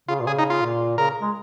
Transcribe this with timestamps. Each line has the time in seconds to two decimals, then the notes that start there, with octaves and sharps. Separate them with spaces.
0.08 C#3 F4
0.21 A#2
0.27 C#3 G#4
0.39 D#4
0.50 F4
0.62 A#2
0.98 C#3 A#4
1.22 G#3